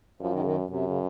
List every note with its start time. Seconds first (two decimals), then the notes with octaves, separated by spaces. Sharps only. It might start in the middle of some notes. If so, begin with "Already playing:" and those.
0.20 F#2 F3
0.33 D#3
0.40 C#3
0.45 D#3
0.70 F#2 C3
0.86 C#3